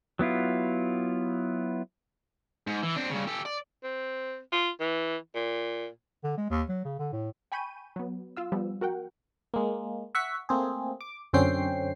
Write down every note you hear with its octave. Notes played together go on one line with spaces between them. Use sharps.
F#3 B3 E4 F4
G#2
E3
C4 D4
G2 C#3
G4 A4
D5
C4
F4
E3
A#2
D3
G#3
D#2
F#3
C#3
D3
A2
G5 G#5 B5 C#6 G6 D#7
F#3 B3
F4 F5 E6
F3 G3 B3
F#4 A#4 F#5 G5
G#3 A#3
E5 F#5 C#6 B6
A3 A#3 C4 G#4
D6
F#2 D3 C4 C#4 G5 C7